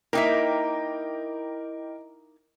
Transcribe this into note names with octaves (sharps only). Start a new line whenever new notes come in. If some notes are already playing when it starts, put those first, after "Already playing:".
A#3 D#4 E4 A#4 D#5 E5 G5 D6